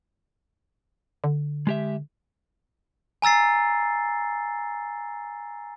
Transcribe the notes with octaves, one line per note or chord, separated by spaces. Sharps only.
D3
G#3 G4 E5
G#5 A#5 E6 A6 C7